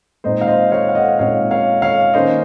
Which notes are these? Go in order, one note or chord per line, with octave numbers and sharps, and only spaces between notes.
A#2 G#3 C4 D#4 C5 D#5
F5
C5 D#5
C#5 F5
F5
D#5 F#5
A#2 G#3 C4 D#4 C#5 F5
C#5 F5
C#5 F5
D#3 A#3 C#4 C5 D#5